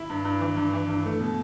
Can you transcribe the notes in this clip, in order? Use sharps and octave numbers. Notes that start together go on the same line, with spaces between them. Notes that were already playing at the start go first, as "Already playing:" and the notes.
Already playing: E4
G2
G2
E3
G2
E3
G2
A3
B2